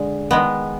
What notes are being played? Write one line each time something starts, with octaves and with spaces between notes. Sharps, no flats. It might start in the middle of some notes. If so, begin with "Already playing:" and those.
Already playing: D3 G#3
D#3 G#3 B3